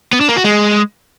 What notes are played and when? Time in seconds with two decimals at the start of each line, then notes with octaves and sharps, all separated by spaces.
0.13 B3
0.21 D4
0.28 A#3
0.36 F#4
0.44 G#3